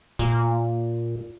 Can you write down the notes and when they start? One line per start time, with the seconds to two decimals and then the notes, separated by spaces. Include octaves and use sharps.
0.19 A#2